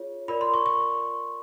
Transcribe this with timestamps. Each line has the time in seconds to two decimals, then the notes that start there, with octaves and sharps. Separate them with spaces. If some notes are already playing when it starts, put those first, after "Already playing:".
Already playing: F4 G#4 C#5
0.28 F4 A#4 D5 B5
0.41 C6
0.54 C#6
0.66 C#6